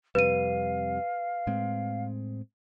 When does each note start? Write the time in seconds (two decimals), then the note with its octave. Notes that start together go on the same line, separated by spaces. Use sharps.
0.15 F2 C3 G3 B4 F5 D#7
1.47 A2 G#3 C4